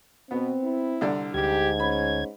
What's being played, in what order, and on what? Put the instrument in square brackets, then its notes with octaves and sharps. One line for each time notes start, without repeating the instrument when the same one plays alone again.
[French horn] B2 [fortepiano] B3 [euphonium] C4
[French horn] E4
[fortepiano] C2 D3 D5
[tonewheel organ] D2 G#6 [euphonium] G#2 [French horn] G4
[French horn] C#4 [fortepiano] B5